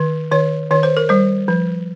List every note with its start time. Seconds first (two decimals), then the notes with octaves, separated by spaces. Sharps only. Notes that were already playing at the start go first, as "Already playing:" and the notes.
Already playing: D#3
0.31 D#3 C#5
0.71 D#3 C#5
0.83 C5
0.97 A#4
1.09 G3 C5
1.48 F3